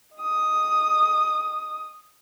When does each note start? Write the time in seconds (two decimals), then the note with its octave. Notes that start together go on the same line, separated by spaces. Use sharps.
0.16 D#5 D#6